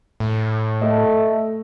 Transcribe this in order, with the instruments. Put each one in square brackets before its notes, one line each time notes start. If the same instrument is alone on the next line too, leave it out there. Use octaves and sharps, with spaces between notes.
[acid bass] A2
[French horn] A3 [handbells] A4 D#5